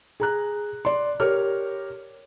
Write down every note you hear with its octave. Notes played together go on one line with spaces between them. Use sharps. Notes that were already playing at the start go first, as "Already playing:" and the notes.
G#4 A#5 F#6
D5 C6
G4 A#4 C#5 F6